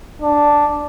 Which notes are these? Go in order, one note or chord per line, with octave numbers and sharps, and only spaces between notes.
D4